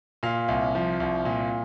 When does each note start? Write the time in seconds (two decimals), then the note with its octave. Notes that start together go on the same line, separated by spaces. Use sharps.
0.23 A#2 F5
0.48 C2
0.75 F3
1.00 C2
1.25 A#2